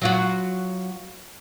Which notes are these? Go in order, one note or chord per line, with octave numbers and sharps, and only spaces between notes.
F#3 F4 F#4